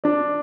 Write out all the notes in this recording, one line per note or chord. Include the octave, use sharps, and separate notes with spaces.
D4 D5